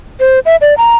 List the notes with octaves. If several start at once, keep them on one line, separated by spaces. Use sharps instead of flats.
C5
E5
D5
A#5